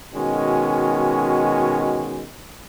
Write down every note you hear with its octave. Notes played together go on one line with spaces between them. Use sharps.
B2 D#3 G#3 C#4 F#4